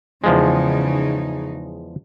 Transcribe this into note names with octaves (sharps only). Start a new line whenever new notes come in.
E2 C#3 F3 G#3 D#4